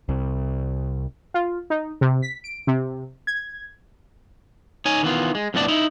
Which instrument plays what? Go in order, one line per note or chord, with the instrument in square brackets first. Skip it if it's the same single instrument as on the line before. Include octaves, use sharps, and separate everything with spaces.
[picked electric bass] C2
[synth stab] F4
D#4
C3
B6
D7
C3
G#6
[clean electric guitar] D#4 C#5 G#5
D#3 E3 B3 F4
G#3
F2 A2 B3 C#4 D5 A5
D#4 E4